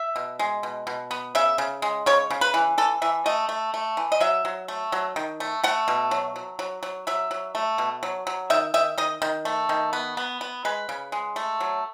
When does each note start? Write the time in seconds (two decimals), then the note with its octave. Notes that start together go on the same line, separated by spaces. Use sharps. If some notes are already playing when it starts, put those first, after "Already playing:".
Already playing: E5
0.16 B2
0.39 G#3
0.63 B2
0.87 B2
1.11 B3
1.35 C#3 E5
1.58 C#3
1.82 G#3
2.06 C#3 C#5
2.30 C#3
2.41 B4
2.54 E3
2.78 E3 A4
3.02 E3 E5
3.26 A3 D#5
3.49 A3
3.74 A3
3.97 E3
4.12 D#5
4.20 F#3 E5
4.45 F#3
4.68 A3
4.92 F#3
5.16 D#3
5.40 A3
5.63 A3 F#5
5.88 B2
6.11 F#3
6.36 F#3
6.59 F#3
6.83 F#3
7.07 F#3 E5
7.31 F#3
7.55 A3
7.78 B2
8.03 F#3
8.27 F#3
8.50 D#3 E5
8.74 D#3 E5
8.98 D#3 D#5
9.22 D#3
9.45 A3
9.69 D#3
9.93 B3
10.17 B3
10.41 B3
10.65 G#3 B4
10.89 C#3
11.12 G#3
11.36 A3
11.60 F#3